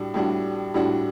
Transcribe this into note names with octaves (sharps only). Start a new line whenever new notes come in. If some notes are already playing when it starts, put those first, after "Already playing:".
Already playing: A2 G3 D4 F#4
A2 G3 D4 F#4
A2 G3 D4 F#4